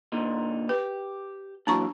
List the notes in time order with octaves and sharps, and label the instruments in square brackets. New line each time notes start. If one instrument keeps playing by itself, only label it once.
[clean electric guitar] A#2 D3 D#4
[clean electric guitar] G4 [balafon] B4
[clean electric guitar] A#2 E3 F#3 [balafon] D4 A#5 C#6